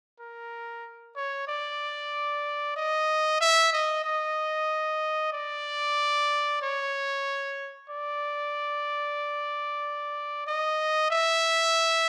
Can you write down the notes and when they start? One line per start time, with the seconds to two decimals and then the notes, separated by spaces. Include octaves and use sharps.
0.20 A#4
1.16 C#5
1.48 D5
2.76 D#5
3.41 E5
3.73 D#5
4.04 D#5
5.33 D5
6.62 C#5
7.90 D5
10.47 D#5
11.11 E5